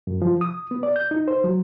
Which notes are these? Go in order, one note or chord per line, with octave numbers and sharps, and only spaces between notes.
F#2
F3
D#6
B3
D5
G6
D#4
C5
F#3